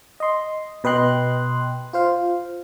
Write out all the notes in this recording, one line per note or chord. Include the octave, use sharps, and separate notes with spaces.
D#5 C6
B2 B4 D#5 G5 C6 F#6
F4 C5 F5